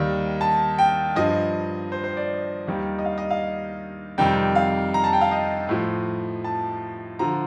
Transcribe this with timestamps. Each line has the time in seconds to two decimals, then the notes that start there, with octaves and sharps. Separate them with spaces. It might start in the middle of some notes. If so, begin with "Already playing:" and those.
Already playing: D#2 D#3 G3 D5
0.41 A5
0.78 G5
1.16 G2 F3 D#5
1.92 C5
2.04 C5
2.17 D5
2.67 D#2 D#3 G3
2.99 D#5
3.05 F5
3.18 D#5
3.31 F5
4.18 F2 C3 D#3 G3 G5
4.55 F5
4.94 A#5
5.04 A5
5.13 G5
5.21 F5
5.31 D#5
5.69 A2 F3
6.44 A5
7.19 D3 F3 A#5